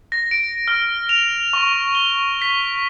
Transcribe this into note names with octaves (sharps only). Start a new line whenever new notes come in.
A#6
D7
F6
F7
C#6
G7
B6